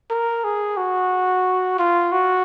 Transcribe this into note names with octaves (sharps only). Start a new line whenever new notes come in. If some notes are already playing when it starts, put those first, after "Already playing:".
A#4
G#4
F#4
F4
F#4